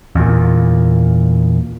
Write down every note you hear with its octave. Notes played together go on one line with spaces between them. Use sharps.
E2 A#2